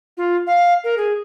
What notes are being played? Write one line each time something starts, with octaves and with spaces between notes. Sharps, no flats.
F4
F5
A#4
G#4